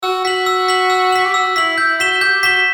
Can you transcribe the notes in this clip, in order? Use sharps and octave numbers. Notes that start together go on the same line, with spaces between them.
F#4 E6
F#4 B6 F#7
E6
B6 F#7
E6
B6 F#7
G4
F#4 E6
E4 B6 F#7
E4 G6
F#4 B6 E7 G7
G4 G6
F#4 B6 E7 G7